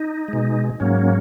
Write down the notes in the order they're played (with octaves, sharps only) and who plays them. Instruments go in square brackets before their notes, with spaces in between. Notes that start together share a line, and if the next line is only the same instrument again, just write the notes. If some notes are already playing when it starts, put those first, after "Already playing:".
Already playing: [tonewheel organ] D#4
B2 G#3
G#2 F#3 A#3 C#4